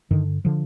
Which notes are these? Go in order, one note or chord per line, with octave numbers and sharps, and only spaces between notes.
G2 D3 D#3
D3 F3